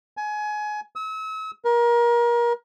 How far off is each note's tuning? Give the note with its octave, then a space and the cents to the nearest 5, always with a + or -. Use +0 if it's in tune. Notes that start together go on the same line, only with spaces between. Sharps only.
G#5 +25
E6 -40
A#4 +30